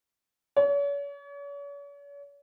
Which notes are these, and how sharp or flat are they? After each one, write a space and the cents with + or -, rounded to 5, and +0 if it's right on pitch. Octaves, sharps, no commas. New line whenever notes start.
C#5 +40